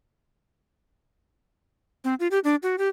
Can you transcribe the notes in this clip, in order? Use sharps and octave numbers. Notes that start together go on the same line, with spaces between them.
C4
F4
G4
D4
F#4
G4